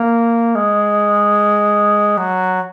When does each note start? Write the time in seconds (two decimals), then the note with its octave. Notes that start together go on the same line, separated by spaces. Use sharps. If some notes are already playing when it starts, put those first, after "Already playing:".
Already playing: A#3
0.55 G#3
2.17 F#3